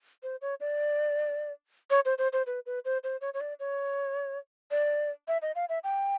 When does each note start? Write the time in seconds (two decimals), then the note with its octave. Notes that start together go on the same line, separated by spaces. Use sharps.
0.23 C5
0.41 C#5
0.60 D5
1.90 C#5
2.05 C5
2.18 C5
2.33 C5
2.47 B4
2.66 B4
2.85 C5
3.04 C5
3.21 C#5
3.34 C#5
3.41 D5
3.60 C#5
4.71 D5
5.28 E5
5.42 D#5
5.55 F5
5.69 E5
5.84 G5